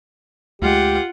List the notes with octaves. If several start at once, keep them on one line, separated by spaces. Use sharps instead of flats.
D2 G#3 F4 G4 F#5